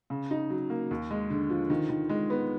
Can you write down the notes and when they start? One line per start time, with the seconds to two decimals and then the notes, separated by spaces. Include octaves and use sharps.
0.10 C#3
0.31 D#4
0.50 F#3
0.70 A#3
0.91 D#2
1.11 G#3
1.30 D3
1.50 F3
1.70 D#3
1.89 D#3
2.09 G#3
2.30 B3